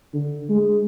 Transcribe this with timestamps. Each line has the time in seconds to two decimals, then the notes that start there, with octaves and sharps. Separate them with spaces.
0.14 D3
0.49 G#3